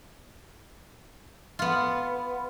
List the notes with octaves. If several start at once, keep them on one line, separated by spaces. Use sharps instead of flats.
B3 F4